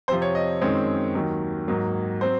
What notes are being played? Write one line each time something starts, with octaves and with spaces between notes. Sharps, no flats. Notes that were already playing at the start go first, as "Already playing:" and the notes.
F2 C3 F3 C5
C#5
D#5
F#2 D#3 G#3 C4 C#5
D#2 D#3 F#3
G#2 F#3 A#3
F#3 C4 C5